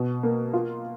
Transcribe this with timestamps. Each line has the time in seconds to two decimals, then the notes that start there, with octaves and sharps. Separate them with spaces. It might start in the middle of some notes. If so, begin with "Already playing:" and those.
Already playing: B2
0.23 A#3
0.53 F4